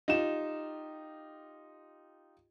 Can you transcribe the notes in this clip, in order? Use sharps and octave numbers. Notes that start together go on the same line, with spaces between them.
D#4 F4 G4 E7